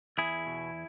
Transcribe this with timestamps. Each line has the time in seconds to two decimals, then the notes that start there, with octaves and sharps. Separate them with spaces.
0.18 E2 E4 G#4
0.46 B2